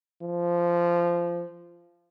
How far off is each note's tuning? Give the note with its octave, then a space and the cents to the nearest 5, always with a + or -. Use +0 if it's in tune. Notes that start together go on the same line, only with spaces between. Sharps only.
F3 -15